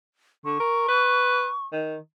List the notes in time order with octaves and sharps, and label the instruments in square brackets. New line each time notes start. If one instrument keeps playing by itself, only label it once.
[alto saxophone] D3 [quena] C#6
[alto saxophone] A#4
B4
D#3